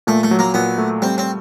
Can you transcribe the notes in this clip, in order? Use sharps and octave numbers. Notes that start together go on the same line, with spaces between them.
A#2 A3
A3
F#3
A#3
A#2 B3
A3
G3 C4
C4